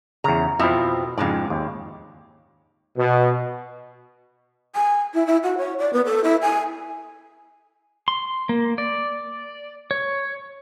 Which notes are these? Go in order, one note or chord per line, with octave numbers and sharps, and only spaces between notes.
E2 C#3 A#5
F2 B2 F3 C4 E4
F2 G#2 C#3 G#3 D5
D#2
B2
G#5
E4
E4
F#4
C#5
D5
B3
A4
E4
G#5
C6
A#3
D5
C#5